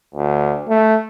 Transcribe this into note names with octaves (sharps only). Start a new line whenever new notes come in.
D2
A3